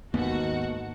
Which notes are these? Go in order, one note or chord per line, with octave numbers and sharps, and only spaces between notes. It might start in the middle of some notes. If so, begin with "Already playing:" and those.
D#2 G#2 A#3 B3 D#4 F#4 A4 F#5